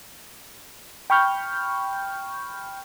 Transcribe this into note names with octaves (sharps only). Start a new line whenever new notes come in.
G5 B5 C#6 F6 G6